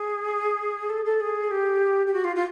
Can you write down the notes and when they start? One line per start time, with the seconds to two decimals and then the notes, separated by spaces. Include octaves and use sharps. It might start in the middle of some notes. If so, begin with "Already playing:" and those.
Already playing: G#4
0.89 A4
1.05 A4
1.20 G#4
1.50 G4
2.06 G4
2.13 F#4
2.24 F4
2.35 F4